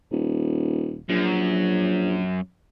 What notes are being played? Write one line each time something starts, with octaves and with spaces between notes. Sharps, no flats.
D#1
A#1 F#2